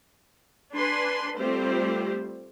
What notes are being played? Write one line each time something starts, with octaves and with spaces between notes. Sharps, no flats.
D4 B4 G#5 C6
G3 A3 C4 F4 G4 C5